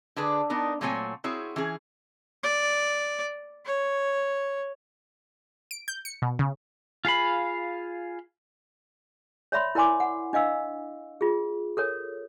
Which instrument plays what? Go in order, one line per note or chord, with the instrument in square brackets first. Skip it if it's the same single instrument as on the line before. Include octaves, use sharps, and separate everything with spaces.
[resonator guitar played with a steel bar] D3 D4 G#4 B4
B3 D4 D#4 A#4
A#2 F#3 A3 C4 C#5 G#5
C4 E4 F#4 G#4 C#5
E3 C#4 G#4
[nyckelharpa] D5
C#5
[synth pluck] D7
G6
C#7
B2
C#3
[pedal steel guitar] F4 G#4 F5 B5
[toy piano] C#5 D5 E5 B5 C6
E4 A#4 D5 G#5 C6 D6
F#5
D4 D#5 F5 E6
F4 G#4
A4 A#4 C#5